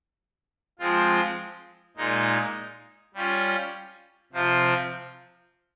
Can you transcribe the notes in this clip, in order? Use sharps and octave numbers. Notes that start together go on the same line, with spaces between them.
F3 G#3 C4 F4
A#2 G#3 D#4
G3 C#4 F4
C3 F3 C4 F4